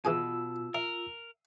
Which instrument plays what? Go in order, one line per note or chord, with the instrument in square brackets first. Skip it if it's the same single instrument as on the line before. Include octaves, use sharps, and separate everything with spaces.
[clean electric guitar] B2 [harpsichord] E3 G#4 G#5 [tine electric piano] F4 E6
[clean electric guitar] A#4 [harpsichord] E5